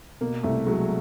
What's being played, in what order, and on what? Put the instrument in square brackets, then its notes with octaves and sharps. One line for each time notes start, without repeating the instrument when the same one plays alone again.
[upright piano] B2 [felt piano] A#3
[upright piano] C2 [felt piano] A3
[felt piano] F#3 [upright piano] G#3